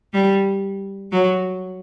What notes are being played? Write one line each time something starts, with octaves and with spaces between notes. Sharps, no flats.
G3
F#3